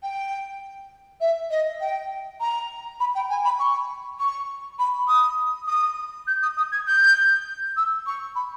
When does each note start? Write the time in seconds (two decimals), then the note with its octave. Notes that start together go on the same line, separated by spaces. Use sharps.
0.02 G5
1.20 E5
1.50 D#5
1.80 G5
2.40 A#5
3.00 B5
3.14 G5
3.29 G#5
3.44 B5
3.59 C#6
4.19 C#6
4.79 B5
5.08 D#6
5.67 D#6
6.27 G6
6.42 D#6
6.57 D#6
6.71 G#6
6.87 G6
7.76 E6
8.06 C#6
8.35 B5